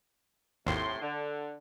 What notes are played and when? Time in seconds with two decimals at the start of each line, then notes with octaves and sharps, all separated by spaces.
0.67 G#1 D#2 A2 C3 C6
1.01 D3